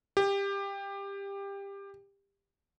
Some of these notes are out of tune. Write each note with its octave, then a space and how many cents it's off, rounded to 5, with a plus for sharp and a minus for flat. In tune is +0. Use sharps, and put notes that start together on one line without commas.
G4 +20